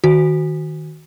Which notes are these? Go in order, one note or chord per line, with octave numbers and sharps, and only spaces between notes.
D#3 F#4